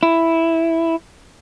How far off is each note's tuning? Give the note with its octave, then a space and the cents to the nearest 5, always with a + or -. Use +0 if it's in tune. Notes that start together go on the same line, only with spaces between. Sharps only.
E4 +0